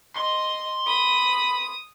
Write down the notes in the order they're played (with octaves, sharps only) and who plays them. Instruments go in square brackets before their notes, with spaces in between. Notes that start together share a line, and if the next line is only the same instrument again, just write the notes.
[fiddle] D#5 [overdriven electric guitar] C6
[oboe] B5 [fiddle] D#6